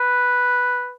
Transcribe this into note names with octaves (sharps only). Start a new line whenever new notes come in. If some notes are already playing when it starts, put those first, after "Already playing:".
Already playing: B4